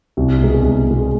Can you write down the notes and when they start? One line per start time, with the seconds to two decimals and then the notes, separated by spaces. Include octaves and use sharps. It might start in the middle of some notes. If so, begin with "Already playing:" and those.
0.17 C2
0.41 B2 G#3
0.63 C2
0.87 B2 G#3